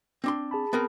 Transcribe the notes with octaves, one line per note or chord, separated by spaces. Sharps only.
C4 D4 C6
G#4 A5 B5
B3 C4 A#4